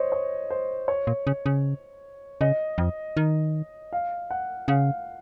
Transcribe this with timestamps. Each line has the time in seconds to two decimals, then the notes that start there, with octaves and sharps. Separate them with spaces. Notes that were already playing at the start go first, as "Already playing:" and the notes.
Already playing: C5 C#5 D#5
0.12 C#5
0.50 C5
0.88 C#5
1.07 A#2
1.27 C#3
1.46 C#3
2.41 C#3 D#5
2.78 F2
3.17 D#3
3.93 F5
4.31 F#5
4.68 C#3 F5